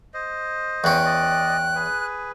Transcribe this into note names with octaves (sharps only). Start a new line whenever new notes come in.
C5 D#5
E2 C#4 G5 F#6
D5 D#5
G#4 B4